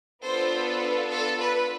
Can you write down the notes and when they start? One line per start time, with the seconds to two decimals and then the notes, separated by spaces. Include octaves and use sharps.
0.24 B3 D4 F4 A4 C5
0.67 B4
1.10 A4
1.39 B4